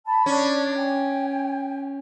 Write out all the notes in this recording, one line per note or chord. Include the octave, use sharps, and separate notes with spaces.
A5 B5
C#4 D4
G5 G#5